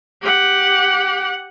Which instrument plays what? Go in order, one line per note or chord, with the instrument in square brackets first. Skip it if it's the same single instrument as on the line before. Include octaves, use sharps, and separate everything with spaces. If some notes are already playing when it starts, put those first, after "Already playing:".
[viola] G4 F#5